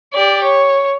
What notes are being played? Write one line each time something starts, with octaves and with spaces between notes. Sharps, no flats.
G4 D5
C#5